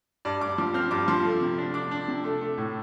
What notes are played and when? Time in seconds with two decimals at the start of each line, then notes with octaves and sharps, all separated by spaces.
0.25 G2 D5
0.41 G2 D6
0.58 F3 D6
0.74 C4 F6
0.91 G2 D6
1.08 F3 C6
1.24 A3
1.41 C3
1.58 D4
1.74 D4 D6
1.91 D4
2.08 C3
2.24 A3
2.41 A3
2.58 A2